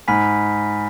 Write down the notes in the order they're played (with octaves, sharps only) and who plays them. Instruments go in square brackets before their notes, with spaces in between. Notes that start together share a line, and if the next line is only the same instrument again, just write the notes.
[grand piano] G#2 [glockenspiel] G#5 B5 F6 B6